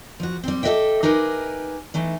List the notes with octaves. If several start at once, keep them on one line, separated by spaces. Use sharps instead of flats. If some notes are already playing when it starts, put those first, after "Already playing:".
F3 F#4
G3 C4
G4 A4 C5 D#5 E5 G5
D#4 G4 G#4 A#4 B4
E3 A3 D#4